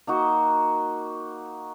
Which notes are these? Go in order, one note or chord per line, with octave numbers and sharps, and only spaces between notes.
A#3 D#4 F#4